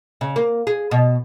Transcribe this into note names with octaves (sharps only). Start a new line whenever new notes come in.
C#3
A#3
G#4
B2